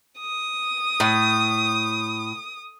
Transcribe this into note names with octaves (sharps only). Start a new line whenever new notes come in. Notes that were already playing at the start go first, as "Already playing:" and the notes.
D#6
A2